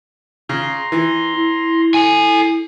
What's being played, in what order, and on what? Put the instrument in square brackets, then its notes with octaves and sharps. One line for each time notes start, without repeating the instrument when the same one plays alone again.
[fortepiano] C#3 [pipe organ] A#5 C6
[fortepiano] E3
[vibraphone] E4
[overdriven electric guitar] A4 G#5